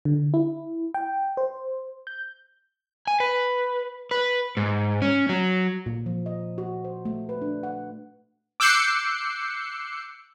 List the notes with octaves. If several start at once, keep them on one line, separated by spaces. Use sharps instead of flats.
D3
E4
G5
C5
G6
G#5
B4
B4
G#2
C#4
F#3
A#2
F3
D#5
F#4
C5
A3
B4
D4
F#5
D6 E6 F#6 G6 C7 C#7